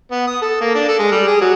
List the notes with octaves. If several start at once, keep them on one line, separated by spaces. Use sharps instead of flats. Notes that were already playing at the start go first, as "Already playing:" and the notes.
B3
D#6
A4
A#3
D4
A4
G#3
G3
G#4
F#3